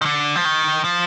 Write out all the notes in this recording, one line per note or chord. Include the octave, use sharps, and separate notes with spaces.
D#3
D3
F3
D#3
F3